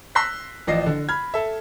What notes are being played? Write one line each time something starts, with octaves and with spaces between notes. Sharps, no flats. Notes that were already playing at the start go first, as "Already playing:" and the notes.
C6 E6 F#6 A#6 B6
A1 F3 D5 D#5 A#6 C7
D3
B5 F6 G#6
A4 E5